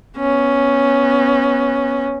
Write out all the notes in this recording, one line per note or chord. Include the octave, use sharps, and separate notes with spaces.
B3 C#4